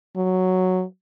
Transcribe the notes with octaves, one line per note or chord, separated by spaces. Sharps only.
F#3